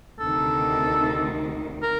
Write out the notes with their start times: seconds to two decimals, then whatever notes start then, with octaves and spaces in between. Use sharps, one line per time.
0.20 D2 C3 D#3 A4
1.83 A#4